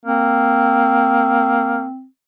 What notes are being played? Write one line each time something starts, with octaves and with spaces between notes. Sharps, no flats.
A#3 C4